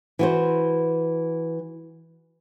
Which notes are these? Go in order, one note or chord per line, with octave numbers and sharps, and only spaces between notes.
E3 F#4 C5